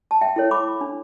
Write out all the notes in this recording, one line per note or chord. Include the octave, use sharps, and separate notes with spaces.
A5
E5 G5
E4 A4 C#5
B5 D6
D4